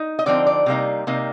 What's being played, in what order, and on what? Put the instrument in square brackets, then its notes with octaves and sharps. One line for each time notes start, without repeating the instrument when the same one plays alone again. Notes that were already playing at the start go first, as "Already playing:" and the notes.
Already playing: [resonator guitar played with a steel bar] D#4
D#5
D3 F3 C4 D#4 D5
D5
C3 G3 A#3 D#4
C3 G3 A#3 D#4